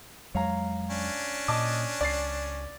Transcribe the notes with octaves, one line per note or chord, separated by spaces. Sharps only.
F2 F#3 G#3 C#5 F5 A#5
C#4 D4
A#2 D#5 A5 D6
C#2 D5 A6 C7